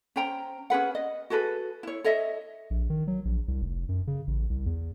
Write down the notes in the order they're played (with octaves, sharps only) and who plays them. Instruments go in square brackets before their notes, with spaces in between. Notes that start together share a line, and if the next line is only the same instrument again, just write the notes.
[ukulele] C#4 C5 G5 A#5
C#4 G#4 B4 F#5
D#5
F#4 G#4 A4 B4
E4 C#5
A4 C#5 D#5 E5
[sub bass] A#1
D#3
F#3
A#1
C2
F1
F#2
C#3
A1
C2
E2